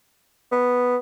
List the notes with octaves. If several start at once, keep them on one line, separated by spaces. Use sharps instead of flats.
B3